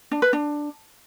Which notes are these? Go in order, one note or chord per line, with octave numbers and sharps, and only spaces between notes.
D4
B4
D4